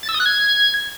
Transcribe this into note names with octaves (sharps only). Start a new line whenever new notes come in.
A6
E6
D#6
F#6
G#6